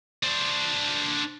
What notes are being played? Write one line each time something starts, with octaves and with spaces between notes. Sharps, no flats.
D4 C5